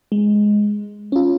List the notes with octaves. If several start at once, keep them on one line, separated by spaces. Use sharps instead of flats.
G#3
C#4 F4